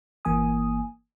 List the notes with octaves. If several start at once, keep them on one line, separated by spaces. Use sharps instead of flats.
G1 E3 A#3 G#5 D#6